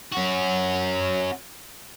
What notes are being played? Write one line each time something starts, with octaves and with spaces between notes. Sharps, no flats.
C#4 F#4